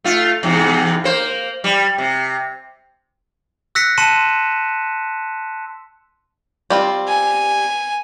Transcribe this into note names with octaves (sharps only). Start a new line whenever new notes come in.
A3 F4
E2 G#2 C3
A#3 C5
G3
C3
E6 F#6 A#6 B6 C#7
A5 C6 C#7 D#7 E7
G3 C4 F4
G#5